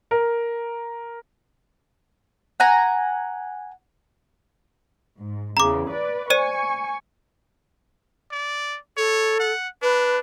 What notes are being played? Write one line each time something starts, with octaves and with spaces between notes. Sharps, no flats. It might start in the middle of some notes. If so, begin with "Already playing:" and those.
A#4
F#5 G#5 A#5
G#2
E2 C#3 A#5 D6
B4 D5
C5 D5 G#5 C#6 D#7
D5
A4 C#5
F#5
D4 B4